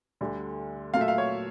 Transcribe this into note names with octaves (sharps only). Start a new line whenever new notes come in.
D2 D3 G3
A#2 F#3 A3 F5
E5
F5
C#5